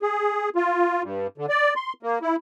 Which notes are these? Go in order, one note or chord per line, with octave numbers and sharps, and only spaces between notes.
G#4
F4
G2
D3
D5
C6
A#3
E4